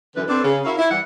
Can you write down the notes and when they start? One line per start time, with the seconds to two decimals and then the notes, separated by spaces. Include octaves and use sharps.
0.15 F#2 D3 E3 B4
0.28 C4 D4 A4 B4 D5
0.44 C#3
0.65 E4 F#4 A#4 C#5 E5 F5
0.78 E4
0.91 E3 G3 F#5